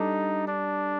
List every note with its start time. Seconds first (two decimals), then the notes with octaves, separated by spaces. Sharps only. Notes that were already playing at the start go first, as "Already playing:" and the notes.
Already playing: G3 D4 D#4 A4
0.47 D4